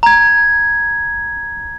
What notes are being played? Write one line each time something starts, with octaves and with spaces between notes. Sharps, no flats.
A#5 G#6